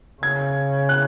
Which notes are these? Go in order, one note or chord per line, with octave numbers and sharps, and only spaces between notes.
C#3 G#6
F#6